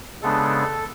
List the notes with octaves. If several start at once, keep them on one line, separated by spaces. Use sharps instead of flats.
C#3 G#3 B3 D4 A4